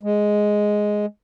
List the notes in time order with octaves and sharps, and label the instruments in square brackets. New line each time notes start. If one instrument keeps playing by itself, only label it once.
[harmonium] G#3